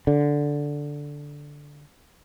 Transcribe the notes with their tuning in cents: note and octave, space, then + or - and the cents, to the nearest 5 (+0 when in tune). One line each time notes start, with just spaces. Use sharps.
D3 -5